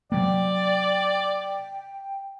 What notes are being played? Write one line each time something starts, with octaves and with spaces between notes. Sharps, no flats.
C3 F#3 A#3 D5 G5